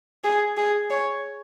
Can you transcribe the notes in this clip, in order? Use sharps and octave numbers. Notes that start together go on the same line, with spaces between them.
G#4
G#4
C#5